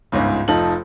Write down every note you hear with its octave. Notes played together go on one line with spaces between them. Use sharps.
G1 C#2 G#2 C#3
F1 F3 D#4 A4 F#7